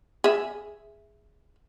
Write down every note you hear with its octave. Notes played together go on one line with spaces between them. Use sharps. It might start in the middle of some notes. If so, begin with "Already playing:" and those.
G#4 E5